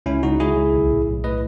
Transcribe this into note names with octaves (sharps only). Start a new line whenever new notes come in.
C#2 C#4 E4
C#2 D#4 F#4
C#2 E4 G#4
C#2
B1
A2
B1
A2 B4 D#5